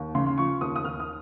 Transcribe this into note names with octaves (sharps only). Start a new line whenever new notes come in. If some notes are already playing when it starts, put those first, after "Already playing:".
Already playing: D#2
C#3 C6
C6
F3 C#6
D#2 D#6
D#6
D#2 F6
D#6